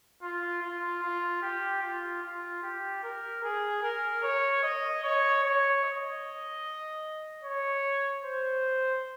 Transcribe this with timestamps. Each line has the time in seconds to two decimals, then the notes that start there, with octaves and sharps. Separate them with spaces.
0.22 F4
0.62 F4
1.03 F4
1.42 G4
1.82 F4
2.23 F4
2.63 G4
3.03 A#4
3.44 G#4
3.83 A#4
4.23 C#5
4.63 D#5
5.03 C#5
5.43 C#5
5.84 D#5
7.43 C#5
8.24 C5